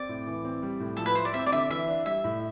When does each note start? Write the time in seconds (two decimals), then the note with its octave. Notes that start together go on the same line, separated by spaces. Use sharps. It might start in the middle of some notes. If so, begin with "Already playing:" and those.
Already playing: C4 D5
0.09 A2
0.27 E3
0.45 C4
0.63 G3
0.80 A2
0.97 F3 A4
1.06 B4
1.15 E4 C5
1.25 D5
1.34 C4 E5
1.46 D5
1.52 D3 E5
1.70 E3 E5
1.88 D4
2.06 G3 E5
2.24 A2